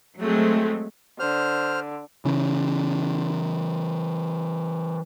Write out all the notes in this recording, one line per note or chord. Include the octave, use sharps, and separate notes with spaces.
F#3 G#3 A3 C4
D3 C5 F6
C#3 E3 C#4